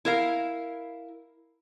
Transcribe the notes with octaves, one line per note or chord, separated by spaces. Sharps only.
E4 A#4 F5